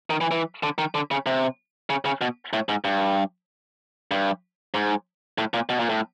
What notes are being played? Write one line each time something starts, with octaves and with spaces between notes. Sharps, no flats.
D#3
E3
E3
D3
D#3
D3
C#3
C3
C#3
C#3
B2
A2
G#2
G2
G2
G#2
A2
A#2
B2
A#2
A2